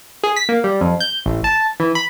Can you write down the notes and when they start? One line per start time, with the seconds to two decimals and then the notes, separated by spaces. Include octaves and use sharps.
0.24 G#4
0.36 B6
0.49 A#3
0.64 G3
0.81 F2
1.00 G6
1.26 A1
1.44 A5
1.80 E3
1.95 B5